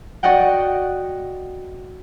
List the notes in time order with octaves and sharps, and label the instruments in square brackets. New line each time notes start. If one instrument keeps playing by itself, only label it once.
[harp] F#4 D5 D#5 F#5 G5